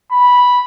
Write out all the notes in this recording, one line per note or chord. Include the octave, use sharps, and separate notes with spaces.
B5